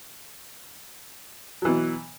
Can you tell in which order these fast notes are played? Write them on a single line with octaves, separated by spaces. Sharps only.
F#3 E3 B2